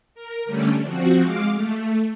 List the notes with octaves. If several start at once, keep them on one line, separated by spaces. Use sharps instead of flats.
A#4
D3 G3 A3 C#4 D4
F3 C4 F#4
G#3 F5 D6 F6
A3